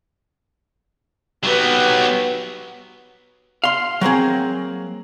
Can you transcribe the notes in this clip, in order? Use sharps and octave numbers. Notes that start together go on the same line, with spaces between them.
F#3 B3 G4 B4
F5 C6
F#3 A#3 C4 G#4